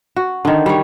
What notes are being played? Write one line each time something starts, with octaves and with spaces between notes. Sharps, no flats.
F#4
D3 D#3
G3 C#5